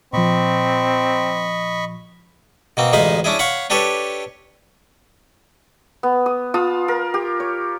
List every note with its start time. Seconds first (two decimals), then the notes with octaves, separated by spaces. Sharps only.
0.13 A#2 F3 C4 D#5 B5 C#6
2.77 B2 A#3 C4
2.93 A1 D2 G#3 D#4 F5 B5
3.24 C#4 D4 E4 G#4
3.39 C#5 F5 F#5 B5
3.70 D4 G4 A4 B4 C#5
6.03 B3
6.26 D#6
6.54 F4 A5 D#6
6.88 A#4
7.14 G4
7.40 C#5